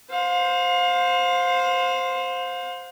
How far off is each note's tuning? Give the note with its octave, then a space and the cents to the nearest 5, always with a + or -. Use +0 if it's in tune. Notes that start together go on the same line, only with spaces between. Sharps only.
C5 +0 F5 +35